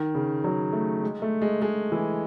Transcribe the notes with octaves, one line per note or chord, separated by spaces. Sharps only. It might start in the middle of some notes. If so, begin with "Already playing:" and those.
Already playing: D#3
C#3
F#3
A3
G#3
A3
G#3
G#3
E3